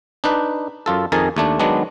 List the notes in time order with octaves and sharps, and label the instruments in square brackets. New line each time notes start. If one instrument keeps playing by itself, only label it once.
[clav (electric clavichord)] D4 D#4 B4
F#2 F4 A4
F2 D#3 G#4 A#4 G#5 A5
D#2 A3 D4
D#3 F#3 G#3 B3 D4